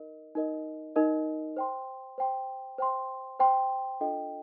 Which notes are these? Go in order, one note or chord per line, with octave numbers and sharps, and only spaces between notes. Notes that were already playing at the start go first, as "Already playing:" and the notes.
Already playing: D#4 A#4 D#5
D#4 A#4 D#5
D#4 A#4 D#5
C5 G5 C6
C5 G5 C6
C5 G5 C6
C5 G5 C6
D4 F4 A4 D#5 G5